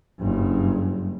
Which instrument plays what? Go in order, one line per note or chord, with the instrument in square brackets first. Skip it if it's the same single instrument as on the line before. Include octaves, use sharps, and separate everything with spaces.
[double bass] F#1 G2